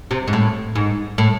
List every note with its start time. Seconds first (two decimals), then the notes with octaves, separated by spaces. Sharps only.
0.11 C3
0.28 G#2
0.33 A2
0.76 G#2
1.18 A2